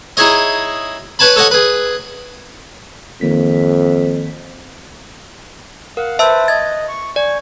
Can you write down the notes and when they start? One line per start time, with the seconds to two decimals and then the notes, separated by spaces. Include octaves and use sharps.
0.17 D#4 E4 G#4 C#5 D#5
1.19 B4 C#5 G#5 A5 B5
1.36 A4 C#5 D#5 F#5 G#5
1.51 G#4 B4
3.21 F2 D#3 A#3 B6
5.97 A#4 F5 F#5
6.19 B4 C5 E5 A5 E6
6.48 D#5 G#6 A6
6.88 C#6
7.16 D5 G#5 C#6